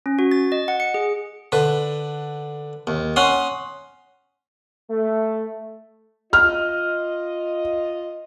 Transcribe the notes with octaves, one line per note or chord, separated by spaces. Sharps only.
C#4
F#4
A6
D#5
F#5
C#7
G#4
D3 B4
D#2
C#4 F#5 C6 D#6
A3
F4 D#5 F6